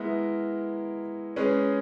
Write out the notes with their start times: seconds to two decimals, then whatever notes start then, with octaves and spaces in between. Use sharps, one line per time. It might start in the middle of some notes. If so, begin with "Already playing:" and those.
Already playing: G#3 B3 E4 A#4
1.36 G#3 C#4 G#4 B4